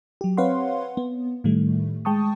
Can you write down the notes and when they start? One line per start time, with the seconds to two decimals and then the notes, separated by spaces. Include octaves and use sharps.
0.21 F#3 G4
0.37 C4 B4 C#5 F5 F#5 C6
0.97 B3
1.44 A2 D#3 G3 A3
2.05 G#3 G5 A5 C#6 D#6